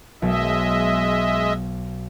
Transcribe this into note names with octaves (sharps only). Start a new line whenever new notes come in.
B1 G#3 D#5 E5